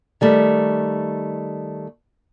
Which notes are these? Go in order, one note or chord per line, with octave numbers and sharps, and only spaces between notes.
D#3 G3 A3